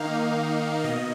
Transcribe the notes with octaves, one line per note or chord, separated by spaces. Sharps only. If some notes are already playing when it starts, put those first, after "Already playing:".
Already playing: D#3 A#3 D#4 F5
B2 D#5